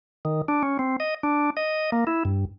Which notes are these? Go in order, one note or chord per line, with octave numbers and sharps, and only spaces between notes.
D#3
D4
C#4
C4
D#5
D4
D#5
A#3
E4
G2